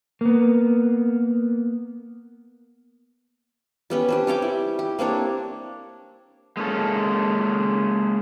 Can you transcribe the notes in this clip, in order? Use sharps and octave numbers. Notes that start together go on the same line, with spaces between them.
A#3 B3
G3 B3 C#4
C4 D4 G4
G3 C#5 G5 D6
E4
G4
A#3 C4 D4 C#5
G#3 A#3 C#4 A4